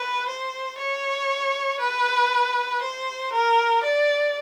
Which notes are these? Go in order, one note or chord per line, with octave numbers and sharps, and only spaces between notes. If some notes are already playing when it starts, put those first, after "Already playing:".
Already playing: B4
C5
C#5
B4
C5
A#4
D5